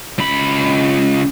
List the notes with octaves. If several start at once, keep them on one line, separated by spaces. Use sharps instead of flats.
C#2 B5